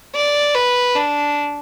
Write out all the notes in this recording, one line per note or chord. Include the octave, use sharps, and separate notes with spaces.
D5
B4
D4